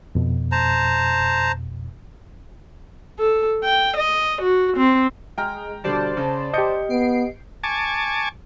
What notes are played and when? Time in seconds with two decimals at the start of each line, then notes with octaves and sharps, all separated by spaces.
0.15 F2 B2
0.52 C5 A5 A#5
3.19 A4
3.64 G5
3.97 D#5
4.42 F#4
4.77 C4
5.38 G#3 G5 A#5 F6
5.84 B2 D3 G3 C5 D5 A5
6.17 C#3
6.54 G4 D#5 G6 C#7
6.90 B3 C7 D7
7.64 G#5 A5 C#6 D6